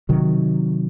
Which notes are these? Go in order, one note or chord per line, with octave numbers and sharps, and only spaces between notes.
C3 D#3 F#3